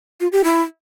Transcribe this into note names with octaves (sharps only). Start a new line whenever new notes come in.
F4
G4
E4